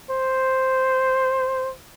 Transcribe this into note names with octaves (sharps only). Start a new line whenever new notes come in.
C5